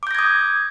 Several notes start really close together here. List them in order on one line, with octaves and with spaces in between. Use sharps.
D6 G6 A#6 G#6 D#6